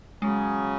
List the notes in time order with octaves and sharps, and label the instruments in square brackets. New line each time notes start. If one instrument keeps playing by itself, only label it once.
[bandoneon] C#3 F#3 C#4 [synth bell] G#3